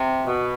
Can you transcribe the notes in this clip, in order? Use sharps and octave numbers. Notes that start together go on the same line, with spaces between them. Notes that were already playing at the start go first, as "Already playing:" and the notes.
Already playing: C3
B2